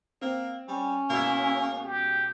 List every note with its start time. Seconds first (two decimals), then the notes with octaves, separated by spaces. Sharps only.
0.22 A#3 C4
0.68 G3 C#4
1.10 C#2 B2 A#3 E4
1.84 G4